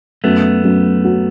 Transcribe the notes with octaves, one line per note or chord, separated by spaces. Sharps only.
F#2 A3 B3
F#2
F#3